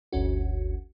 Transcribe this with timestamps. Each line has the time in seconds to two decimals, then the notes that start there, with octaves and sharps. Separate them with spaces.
0.12 G1 D2 C#4 F#4